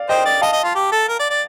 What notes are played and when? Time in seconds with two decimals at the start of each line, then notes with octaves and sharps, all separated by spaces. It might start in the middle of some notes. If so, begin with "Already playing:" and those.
Already playing: D5 F5
0.09 C5 D#5 G5
0.25 D5
0.41 D#5 F5 A5
0.53 D#5
0.64 F4
0.75 G4
0.92 A4
1.08 A#4
1.19 D5
1.30 D5